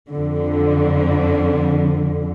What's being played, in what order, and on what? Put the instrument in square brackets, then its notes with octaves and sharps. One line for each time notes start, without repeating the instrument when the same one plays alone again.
[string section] F2 D3